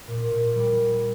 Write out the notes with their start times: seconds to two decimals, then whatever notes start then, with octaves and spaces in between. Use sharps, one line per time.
0.07 A#2
0.31 A#2
0.55 G3